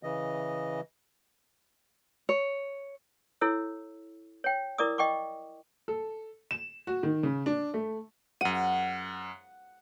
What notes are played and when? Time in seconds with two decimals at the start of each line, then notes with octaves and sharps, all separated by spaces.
0.03 C#3 E3 D#5
2.29 C#5
3.41 E4 A4 C#5 E6
4.44 C#5 G5
4.78 E4 A#4 D5 D6 D#6
4.98 D#5 G5 C#6 D6
5.88 A4
6.51 E7
6.87 F#4
7.03 D#3
7.23 C#3
7.46 D4
7.74 A3
8.41 F#2 F#5 D#7